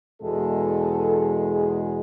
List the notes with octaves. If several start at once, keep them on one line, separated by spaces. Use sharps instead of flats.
E2 B2 G#3 A4
G#4